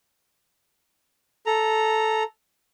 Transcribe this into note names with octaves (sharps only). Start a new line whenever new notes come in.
A4 A#5